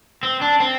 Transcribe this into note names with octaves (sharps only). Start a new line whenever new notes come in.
C4
D4
C4